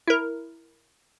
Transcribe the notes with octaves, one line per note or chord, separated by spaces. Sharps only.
E4 A#4